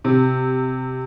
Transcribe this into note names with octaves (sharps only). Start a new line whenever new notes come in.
C3